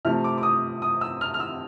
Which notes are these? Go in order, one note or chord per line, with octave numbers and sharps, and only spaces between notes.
C3 F3 A3 F6
D6
D6
D#6
D#6
E6
F6
F6
E6